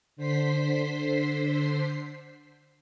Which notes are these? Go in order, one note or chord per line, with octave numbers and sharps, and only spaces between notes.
D3 C5 B6 C7